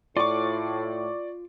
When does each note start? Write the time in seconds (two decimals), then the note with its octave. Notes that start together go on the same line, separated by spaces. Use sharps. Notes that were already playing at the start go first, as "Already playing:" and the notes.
0.17 A2 F4 D5 C#6 D6